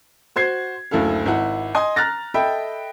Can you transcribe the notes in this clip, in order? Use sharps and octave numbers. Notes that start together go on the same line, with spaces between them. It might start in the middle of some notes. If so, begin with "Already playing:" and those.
F#4 C5 G#6 C7
F#1 D2 E4 A4 F5
G#1 E4 F#5
D#5 G#5 C6 D#6
A#5 F6 F#6 A6 A#6
A4 D#5 E5 G5 B5